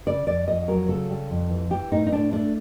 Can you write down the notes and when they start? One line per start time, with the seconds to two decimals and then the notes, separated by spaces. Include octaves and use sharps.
0.06 C#3 D5
0.27 F2 D5
0.48 F2 D#5
0.68 F#3 A#4
0.88 C#3 A4
1.10 G3
1.30 F2
1.50 E3
1.71 E3 G4
1.92 A2 D#4
2.07 D#4
2.12 A2 D4
2.32 A3 D4